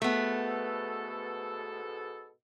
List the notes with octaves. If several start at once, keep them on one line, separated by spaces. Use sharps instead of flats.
G#2 B2 A3 B3 A4